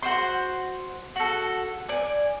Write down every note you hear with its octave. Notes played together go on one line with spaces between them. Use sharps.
F#4 C5 C6
F#4 A4
D5 G#5